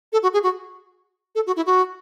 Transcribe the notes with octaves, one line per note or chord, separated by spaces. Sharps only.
A4
F#4
G#4
F#4
A4
F#4
E4
F#4